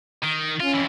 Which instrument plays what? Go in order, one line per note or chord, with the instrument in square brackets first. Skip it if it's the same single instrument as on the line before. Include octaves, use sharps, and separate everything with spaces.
[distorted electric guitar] D#3
[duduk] C#4 [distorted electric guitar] F4
[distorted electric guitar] F2 E3